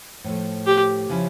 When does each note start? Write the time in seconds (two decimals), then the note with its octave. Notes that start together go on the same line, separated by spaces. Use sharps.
0.24 A2 F3 A3
0.66 G4
1.09 C#3 F3 C#4 E4